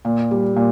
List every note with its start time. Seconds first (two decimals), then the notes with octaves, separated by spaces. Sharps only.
0.05 A#2
0.31 G3
0.56 A#2